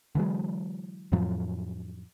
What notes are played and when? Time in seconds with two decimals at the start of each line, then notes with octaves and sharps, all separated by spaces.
0.15 D3 E3 F#3 G#3
1.12 F2 A2 F3 F#3